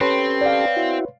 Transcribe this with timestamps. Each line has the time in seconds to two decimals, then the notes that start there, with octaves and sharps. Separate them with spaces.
0.01 C4 C#4 G4 A4 B4 C#5 C6
0.41 D5 F5
0.76 E4 F#4